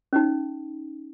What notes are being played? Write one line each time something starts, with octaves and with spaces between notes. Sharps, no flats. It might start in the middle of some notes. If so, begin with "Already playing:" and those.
C#4 D#4